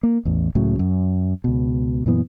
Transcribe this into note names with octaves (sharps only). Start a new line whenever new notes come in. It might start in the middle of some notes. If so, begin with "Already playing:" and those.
A#3
A1 E2
C#2 A2 C#3 F#3
F#2
C#2 B2
F#2 A#2 E3 B3